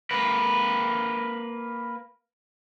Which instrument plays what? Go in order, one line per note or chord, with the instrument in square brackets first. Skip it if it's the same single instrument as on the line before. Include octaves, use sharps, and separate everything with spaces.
[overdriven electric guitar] A#3 B4